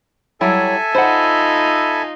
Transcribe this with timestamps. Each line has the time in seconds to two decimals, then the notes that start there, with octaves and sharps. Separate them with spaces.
0.41 F#3 G3 E4 A4 C#5 E5 G#5
0.95 D#4 F4 C5 F#5 B5